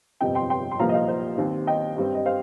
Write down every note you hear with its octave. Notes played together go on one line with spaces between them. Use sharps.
G1 F2 C3 D#5 G5
G5 C6
G5 C6
C6
C2 A#2 F3 A#3 F5 A#5
D#5
C5 F5
C5
D#2 D#3 C4
D#5 G5
G2 G3 C4
D#5
C5 F5